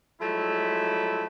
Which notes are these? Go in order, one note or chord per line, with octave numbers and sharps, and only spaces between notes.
F3 F#3 G#3 A3 E4